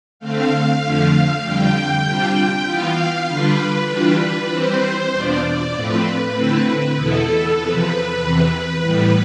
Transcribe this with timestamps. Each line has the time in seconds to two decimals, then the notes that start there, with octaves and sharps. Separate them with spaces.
0.19 D3 A3 C4 F5
0.82 F2 D3 F3 A3
1.42 F2 D3 G3 G5
2.04 C3 G3 D4 F4
2.66 E3 B3 F4 F5
3.27 D3 G3 D4 F4 B4
3.89 E3 G3 D4 F4
4.50 E3 G3 C4 C5
5.12 E2 B2 B3 D4 F4 D5
5.42 D5
5.73 A2 F3 A3 C4 F4 B4
6.35 D3 A3 C4 E4
6.96 E2 B2 B3 E4 A4
7.58 E2 C3 F3 B4
8.19 E2 C3 E3
8.81 A2 E3 G3 B3 B4